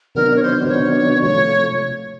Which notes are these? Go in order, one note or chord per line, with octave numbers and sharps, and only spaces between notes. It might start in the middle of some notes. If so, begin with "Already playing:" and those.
C3 D#3 F#3 B3 D4 A#4
C#5
C5
C3 D#3 F#3 B3 D4 C#5
C3 F3 A3 C#5